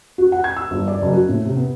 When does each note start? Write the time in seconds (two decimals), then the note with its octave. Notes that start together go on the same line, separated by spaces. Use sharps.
0.18 F#4
0.32 F#5
0.44 G#6
0.57 E6
0.71 G1
0.88 D5
1.02 F#1
1.13 F#4
1.29 A2
1.45 C3
1.57 B3